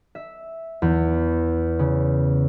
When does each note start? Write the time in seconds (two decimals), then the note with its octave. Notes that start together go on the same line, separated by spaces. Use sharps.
0.15 E5
0.82 E2
1.79 C#3